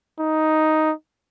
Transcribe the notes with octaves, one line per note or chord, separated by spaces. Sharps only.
D#4